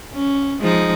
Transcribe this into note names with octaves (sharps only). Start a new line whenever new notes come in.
C#4
F3 G#3 D#4